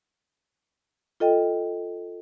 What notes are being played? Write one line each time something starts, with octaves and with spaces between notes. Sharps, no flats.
F4 A4 D#5 G5